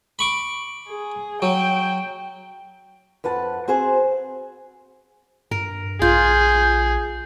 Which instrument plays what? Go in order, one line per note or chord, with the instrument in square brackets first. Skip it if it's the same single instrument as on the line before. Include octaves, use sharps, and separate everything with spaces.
[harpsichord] B5 C#6 D6
[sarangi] G#4
[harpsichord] F#3 [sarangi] G5
[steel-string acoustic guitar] F2 B4 F#5 A5
C4 F#4 G#4 C5
[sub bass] G2 [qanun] A#4
[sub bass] A#1 [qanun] F4 [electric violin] G#4 [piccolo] G6